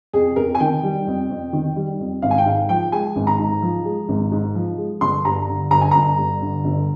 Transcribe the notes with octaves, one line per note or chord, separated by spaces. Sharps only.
F2 G#4
F2 A#4
G#5
D#3 G5
G3
F2
F2
D#3
G3
F2
G#1 F5
G#5
G5
G#2 F5
F3 G5
G#3 G#5
G#1
A#5
G#2
F3
G#3
G#1
G#2
F3
G#3
G1 C6
G2 A#5
D3
G1 A#5
G#5
G1 A#5
G2
D3
G1